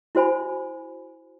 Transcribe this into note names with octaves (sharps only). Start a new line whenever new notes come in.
E4 F#4 C5 G#5 B5